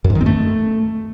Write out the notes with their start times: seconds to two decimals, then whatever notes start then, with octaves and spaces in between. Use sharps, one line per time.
0.04 F#2
0.10 G#2
0.15 D#3
0.21 C4
0.26 A3